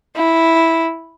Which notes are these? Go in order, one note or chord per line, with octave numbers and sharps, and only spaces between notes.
E4